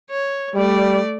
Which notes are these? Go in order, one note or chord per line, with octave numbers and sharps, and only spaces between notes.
C#5
G3 A3 D5